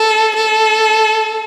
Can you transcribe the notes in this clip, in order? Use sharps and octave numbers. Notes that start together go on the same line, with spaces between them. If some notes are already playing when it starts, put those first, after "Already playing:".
Already playing: A4
A4